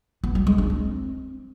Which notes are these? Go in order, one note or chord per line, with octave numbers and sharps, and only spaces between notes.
B3
G3
G#3
D4
C4